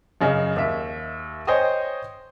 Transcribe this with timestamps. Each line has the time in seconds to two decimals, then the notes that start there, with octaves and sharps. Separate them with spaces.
0.21 F#2 C#3 D#5
0.56 D#2 E5
1.47 C5 C#5 D#5 G5 G#5 D#6